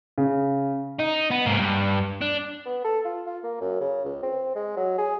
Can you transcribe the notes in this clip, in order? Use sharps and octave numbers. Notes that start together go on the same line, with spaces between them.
C#3
D#4
B3
G#2 A#3
G2
D4
B3
A4
F4
F4
A#3
F#2
C#3
C#2
C4
G#3
F#3
G#4